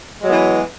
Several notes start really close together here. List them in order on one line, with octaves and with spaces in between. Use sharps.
G#3 F#3 B3 E3